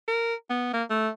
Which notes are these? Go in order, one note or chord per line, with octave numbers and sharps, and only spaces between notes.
A#4
B3
A#3
A3